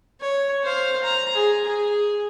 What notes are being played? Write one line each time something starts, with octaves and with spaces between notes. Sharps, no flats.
C#5
C5 F5
A#5
G#4
G#4